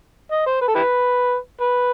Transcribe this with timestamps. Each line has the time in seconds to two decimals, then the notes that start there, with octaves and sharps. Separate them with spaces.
0.32 D#5
0.46 C5
0.61 B4
0.68 A4
0.75 E4 G4 B4
1.61 B4